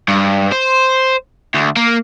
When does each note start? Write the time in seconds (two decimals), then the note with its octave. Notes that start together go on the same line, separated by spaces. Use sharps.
0.08 G2
0.52 C5
1.54 D2
1.77 A#3